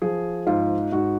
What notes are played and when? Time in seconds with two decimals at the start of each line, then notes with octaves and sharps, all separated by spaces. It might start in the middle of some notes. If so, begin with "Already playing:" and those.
0.02 F3 G#4
0.47 G#2 F4
0.92 G#2 F#4